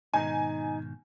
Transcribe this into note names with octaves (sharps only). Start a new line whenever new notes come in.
G#2 B2 D#3 D#4 G#5